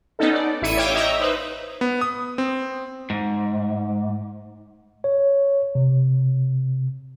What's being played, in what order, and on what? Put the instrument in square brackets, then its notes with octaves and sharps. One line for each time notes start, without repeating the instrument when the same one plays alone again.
[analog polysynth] B3 C#4 D#4 A4
D5
A1 E4 E5 C#7 D#7
C#5 E5 F5 G5 D6
D#5 E5 A#5
D#4 B4 C5
[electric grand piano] B3
D#6
C4
[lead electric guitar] G#2
[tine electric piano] C#5
C3